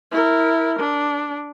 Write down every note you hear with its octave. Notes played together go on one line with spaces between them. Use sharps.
E4 A#4
D4